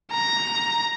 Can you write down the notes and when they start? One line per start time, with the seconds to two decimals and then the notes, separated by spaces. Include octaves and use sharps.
0.12 A#5